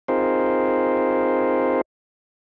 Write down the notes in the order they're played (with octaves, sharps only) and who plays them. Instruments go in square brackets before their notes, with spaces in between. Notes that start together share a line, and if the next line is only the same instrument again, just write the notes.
[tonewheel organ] C4 D#4 F4 G#4 A#4 C5